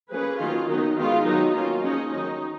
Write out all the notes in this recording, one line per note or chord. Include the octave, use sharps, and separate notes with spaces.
F3 A#3 C#4 G#4 B4
D#3 F#3 A#3 C#4 F4
D#3 F#3 B3 D#4
D#3 G#3 B3 F4
D#3 F#3 B3 D#4
F#3 A#3 C#4 F4
F3 G#3 C#4 D#4
D#3 F#3 C#4 D#4